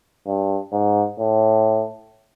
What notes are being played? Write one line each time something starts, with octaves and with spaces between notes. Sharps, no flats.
G2
G#2
A2